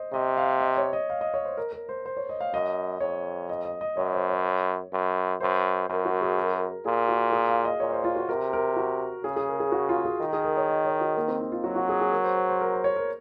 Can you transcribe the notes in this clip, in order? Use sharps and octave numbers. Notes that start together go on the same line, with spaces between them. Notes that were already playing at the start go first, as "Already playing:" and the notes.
Already playing: C5 D#5
C3 D#5
F5
D#5
C#5
D#5
F5
D#5
C#5
C5
A#4
A#4
C5
C5
C#5
D#5
F5
F#2 D#5
F2 C#5
D#5
D#5
D#5
F#2 C#5
C5
C#5
F#2
F#2 C5
F#2 A#4
F#4
G#4
A#4
A#2 G#4
F#4
G#4
F5
D#5
A#2 C#5
C5
F4
F#4
C3 A#4
A#4
F#4
C#3 G#4
G#4
A#4
G#4
F#4
F4
G#4
D#3 A#4
G#4
A#4
C#5
D#5
C#5
F#4
A#3
C4
D#4
F4
F#3 F#4
F#4
G#4
G#4
A#4
C5
C5
C5
A#4
C5
C#5
A#4